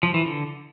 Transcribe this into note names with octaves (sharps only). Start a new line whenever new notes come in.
F3
E3
D3